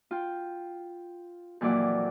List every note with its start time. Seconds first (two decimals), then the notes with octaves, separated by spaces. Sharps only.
0.11 F4 G5
1.61 F2 A#2 E3 F#3 D5 F#5